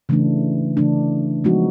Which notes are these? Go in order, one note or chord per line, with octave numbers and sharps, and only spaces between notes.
C#3 E3 A3 D4
C#3 E3 A3 D4
F3 G#3 B3 D#4 F#4